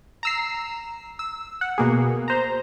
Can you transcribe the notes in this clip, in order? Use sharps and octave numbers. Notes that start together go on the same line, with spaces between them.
A#5 E6 C7
E6
F#5
B2 A#3 G#4
C5 A#5